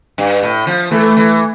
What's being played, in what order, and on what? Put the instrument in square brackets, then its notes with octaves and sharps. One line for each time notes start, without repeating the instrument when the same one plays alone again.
[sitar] G2
A2
F3
[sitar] E3 [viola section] A3
[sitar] E3